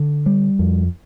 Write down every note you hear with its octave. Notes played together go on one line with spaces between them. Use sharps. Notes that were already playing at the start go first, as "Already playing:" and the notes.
Already playing: D3
G3
F2